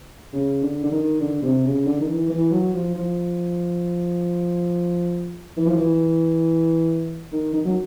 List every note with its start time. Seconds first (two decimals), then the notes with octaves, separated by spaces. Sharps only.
0.33 C#3
0.62 D3
0.83 D3
0.92 D#3
1.20 D3
1.42 C3
1.65 C#3
1.86 D3
2.00 D#3
2.08 E3
2.30 E3
2.51 F#3
2.73 F3
2.95 F3
5.57 E3
5.66 F3
5.76 E3
7.32 D#3
7.53 D#3
7.64 F#3